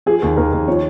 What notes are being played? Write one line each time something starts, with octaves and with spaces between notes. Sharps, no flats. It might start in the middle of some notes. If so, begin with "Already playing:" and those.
F3 G#4
D#2
D#2 A#4
D#2
F3 C#5